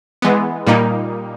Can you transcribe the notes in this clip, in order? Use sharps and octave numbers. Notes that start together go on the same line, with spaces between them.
E3 G#3 B3
A#2 G3 A#3 D#4